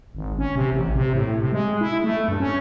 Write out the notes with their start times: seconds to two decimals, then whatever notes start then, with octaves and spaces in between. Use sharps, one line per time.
0.15 G#1
0.38 C#4
0.55 C3
0.72 A1
0.95 C3
1.13 A2
1.39 C3
1.52 G#3
1.81 E4
2.04 A3
2.28 G2
2.40 C#4